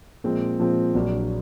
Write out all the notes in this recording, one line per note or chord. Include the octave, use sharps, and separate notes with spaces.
A#2 F3 G#3 C4
A#2 F3 G#3 C4
A#1 A#2 F#3 A#3 D4